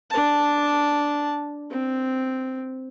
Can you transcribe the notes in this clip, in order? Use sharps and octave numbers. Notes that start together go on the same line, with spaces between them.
D4 A5
C4